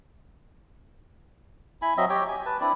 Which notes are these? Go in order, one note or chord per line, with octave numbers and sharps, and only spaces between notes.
E4 G#5 B5
F#3 C4 D#5 E5
G4 C#5 G5
G#5
B4 A5
C4 D4 E4 D5